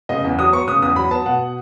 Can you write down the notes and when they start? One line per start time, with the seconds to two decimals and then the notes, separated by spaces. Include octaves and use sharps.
0.09 C#3 D#5
0.24 E2
0.39 F#3 D#6
0.53 B3 C#6
0.68 C#3 D#6
0.82 E2 D#6
0.96 F#3 B5
1.11 B3 A5
1.26 B2 F#5